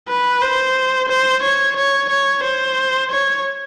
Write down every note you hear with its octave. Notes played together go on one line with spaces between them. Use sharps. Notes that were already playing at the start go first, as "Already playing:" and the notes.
B4
C5
C5
C#5
C#5
C#5
C5
C#5